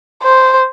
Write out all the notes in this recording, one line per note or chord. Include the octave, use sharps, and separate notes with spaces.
C5